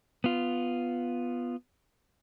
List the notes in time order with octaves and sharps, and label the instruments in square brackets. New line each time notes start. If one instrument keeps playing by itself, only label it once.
[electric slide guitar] B3 F4